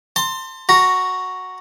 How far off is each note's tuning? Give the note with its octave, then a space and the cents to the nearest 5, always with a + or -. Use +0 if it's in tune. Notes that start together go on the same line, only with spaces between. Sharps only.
A5 +40 C6 +0
F#4 +0 A#5 +0